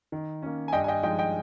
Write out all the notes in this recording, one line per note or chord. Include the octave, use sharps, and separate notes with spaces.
D#3
A#3 C#4
G#5
G2 D#5 G5
G#5
D#5 G5
F3 G#3 D#4 D#5 G5
D#5 G5